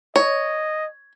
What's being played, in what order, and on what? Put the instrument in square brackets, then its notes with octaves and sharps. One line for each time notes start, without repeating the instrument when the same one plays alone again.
[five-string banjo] C#5 [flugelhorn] D#5